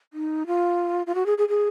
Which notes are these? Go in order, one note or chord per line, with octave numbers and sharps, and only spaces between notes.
D#4
F4
F4
F#4
G#4
G#4
G#4